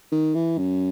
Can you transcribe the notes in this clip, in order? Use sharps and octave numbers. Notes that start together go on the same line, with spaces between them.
D#3
E3
F#2